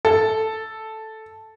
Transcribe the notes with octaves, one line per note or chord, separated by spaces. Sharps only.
A4